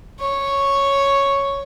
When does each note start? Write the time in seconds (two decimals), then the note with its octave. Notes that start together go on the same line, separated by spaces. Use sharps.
0.20 C#5